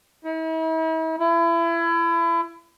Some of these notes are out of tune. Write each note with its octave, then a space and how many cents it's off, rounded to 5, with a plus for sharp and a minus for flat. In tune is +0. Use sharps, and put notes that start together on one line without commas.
E4 -45
E4 +30